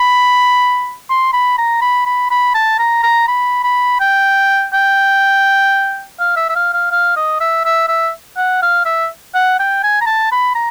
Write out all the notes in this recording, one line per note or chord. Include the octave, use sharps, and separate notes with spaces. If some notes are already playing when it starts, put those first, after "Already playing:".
Already playing: B5
C6
B5
A#5
B5
B5
B5
A5
A#5
A#5
B5
B5
G5
G5
F5
E5
E5
F5
F5
F5
D#5
E5
E5
E5
F#5
F5
E5
F#5
G5
G#5
A#5
A5
B5
A#5